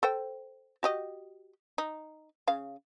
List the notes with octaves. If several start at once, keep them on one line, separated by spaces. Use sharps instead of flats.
A4 C5 G5
F#4 G4 D#5
D#4
C#3 F5